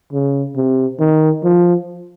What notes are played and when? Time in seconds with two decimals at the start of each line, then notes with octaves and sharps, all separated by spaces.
0.13 C#3
0.56 C3
1.00 D#3
1.43 F3